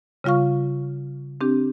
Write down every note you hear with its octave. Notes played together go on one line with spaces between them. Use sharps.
C#3 G3 F4 F5 C#6
C4 D4 G4